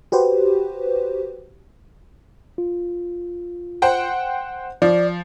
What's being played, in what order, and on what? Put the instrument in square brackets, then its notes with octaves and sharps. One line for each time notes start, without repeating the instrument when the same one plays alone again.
[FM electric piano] F#4 G4 B4 C5
[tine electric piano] F4
[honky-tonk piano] C5 F#5 G5
[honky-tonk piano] F3 [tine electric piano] D5